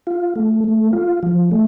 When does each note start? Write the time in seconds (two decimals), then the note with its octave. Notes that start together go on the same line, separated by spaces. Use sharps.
0.07 F4
0.36 A3
0.64 A3
0.93 F4
1.23 F3
1.51 A3